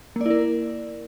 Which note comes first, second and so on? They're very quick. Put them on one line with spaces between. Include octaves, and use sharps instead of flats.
A#3 D5 E4 A#4